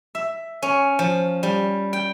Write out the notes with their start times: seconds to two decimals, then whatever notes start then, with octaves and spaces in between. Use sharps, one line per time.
0.15 E5
0.62 C#4
0.99 F3
1.43 G3
1.93 G5